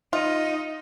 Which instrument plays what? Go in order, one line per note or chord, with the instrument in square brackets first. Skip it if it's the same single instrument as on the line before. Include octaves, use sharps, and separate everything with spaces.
[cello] D#4 [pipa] F4